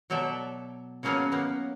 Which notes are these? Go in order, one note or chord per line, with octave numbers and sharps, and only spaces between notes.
B2 F#3 A4 D5 E5
C#3 F3 F#3 A#3 B3 C#4
A#3 B3